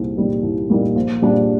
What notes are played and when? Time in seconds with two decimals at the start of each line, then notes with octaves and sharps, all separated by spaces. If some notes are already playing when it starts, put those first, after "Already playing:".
Already playing: C2 A#2 G3 A#3 D#4
0.16 A#2 G3 A#3 D#4
0.43 C2
0.70 A#2 G3 A#3 D#4
0.96 A#1
1.22 A#2 G3 D4